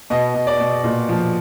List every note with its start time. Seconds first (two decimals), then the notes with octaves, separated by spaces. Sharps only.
0.10 B2 D#5
0.34 B2
0.47 D5
0.60 B2
0.84 A#2
1.09 F3